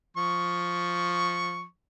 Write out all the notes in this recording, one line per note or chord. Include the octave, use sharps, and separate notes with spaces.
F3 C#6